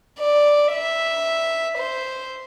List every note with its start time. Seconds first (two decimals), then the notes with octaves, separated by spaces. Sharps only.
0.19 D5
0.72 E5
1.78 C5